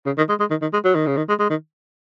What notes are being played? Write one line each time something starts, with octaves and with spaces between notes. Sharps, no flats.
C#3
D#3
G#3
G#3
D#3
D#3
G#3
F#3
D#3
C#3
D#3
G#3
G#3
D#3